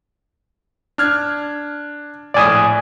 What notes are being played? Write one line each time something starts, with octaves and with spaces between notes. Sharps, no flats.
D4 F6 G#6
A#1 A2 D5 G#5 D#6